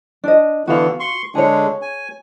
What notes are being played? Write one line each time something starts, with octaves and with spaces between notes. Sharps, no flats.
D4 D#5
D3 E3 B3 F#4 F5
C6 C#6
D3 G#3 D4 G#4 C#5
G#5